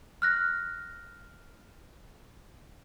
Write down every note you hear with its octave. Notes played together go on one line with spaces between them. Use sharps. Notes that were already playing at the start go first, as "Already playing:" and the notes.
F6 F#6 A#6